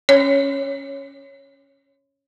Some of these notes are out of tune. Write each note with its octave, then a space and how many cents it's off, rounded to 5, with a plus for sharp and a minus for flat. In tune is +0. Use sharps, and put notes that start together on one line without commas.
C#4 +0 C#5 -5